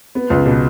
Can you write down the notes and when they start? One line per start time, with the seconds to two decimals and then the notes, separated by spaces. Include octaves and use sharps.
0.15 B3
0.30 C#2
0.46 B2